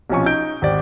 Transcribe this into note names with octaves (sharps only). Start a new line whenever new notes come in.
B1 C3 F3 C#4 G#5 C#6
D#4 G6 D7
G#1 G4 D5